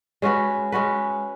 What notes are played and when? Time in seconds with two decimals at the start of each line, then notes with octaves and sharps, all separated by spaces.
0.22 G#3 C#4 F#4 B4
0.72 G#3 C#4 F#4 B4